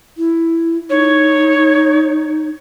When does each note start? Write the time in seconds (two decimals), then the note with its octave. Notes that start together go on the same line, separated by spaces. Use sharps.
0.17 E4
0.90 D#4 C#5